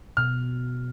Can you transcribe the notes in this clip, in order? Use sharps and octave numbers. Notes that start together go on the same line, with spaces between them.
B2 F6